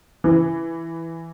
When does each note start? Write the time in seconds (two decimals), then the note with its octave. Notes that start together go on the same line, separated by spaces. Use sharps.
0.24 E3